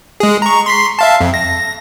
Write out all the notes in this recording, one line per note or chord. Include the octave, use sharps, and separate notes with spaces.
G#3 G#4
A#5 C#6
C6 B6 C7
E5 F5 A5
F2
A#6